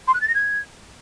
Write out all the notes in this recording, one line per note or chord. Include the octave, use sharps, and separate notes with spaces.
C6
F#6
A6
A#6
G#6